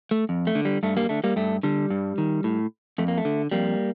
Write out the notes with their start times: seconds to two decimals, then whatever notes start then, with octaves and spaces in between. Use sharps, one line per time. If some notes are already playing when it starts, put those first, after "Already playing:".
0.11 A3
0.29 F2
0.47 A3
0.55 D3
0.65 G3
0.83 G2 A3
0.97 G3 A#3
1.09 D3 A3
1.24 G3 A#3
1.36 G2 A3
1.63 D3 G3
1.90 G2
2.18 D#3
2.44 A2
2.98 F2 A3
3.08 A#3
3.18 A3
3.25 D3
3.51 F2 G3 A#3